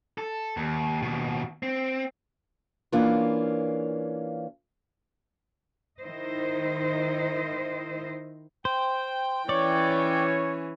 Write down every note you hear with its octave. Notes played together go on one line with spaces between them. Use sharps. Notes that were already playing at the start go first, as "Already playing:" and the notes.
A4
D#2
D#2 B2
C4
E3 A#3 C#4 D4 F4
D#3 D#4 E4 C5 D#5
C5 G5
E3 C#4 C#5 D5